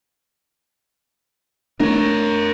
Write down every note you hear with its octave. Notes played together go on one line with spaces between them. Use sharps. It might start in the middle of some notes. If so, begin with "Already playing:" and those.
A3 B3 D4 A#4 C#5